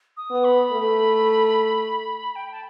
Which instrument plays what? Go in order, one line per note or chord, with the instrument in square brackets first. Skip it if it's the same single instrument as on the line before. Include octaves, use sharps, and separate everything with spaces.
[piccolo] D#6
[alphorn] B3
[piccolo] B5
[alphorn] A3
[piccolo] G5
A5